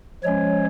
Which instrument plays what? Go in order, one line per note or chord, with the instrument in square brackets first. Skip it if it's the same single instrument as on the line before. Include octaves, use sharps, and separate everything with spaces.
[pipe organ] F3 G#3 C#4 C#5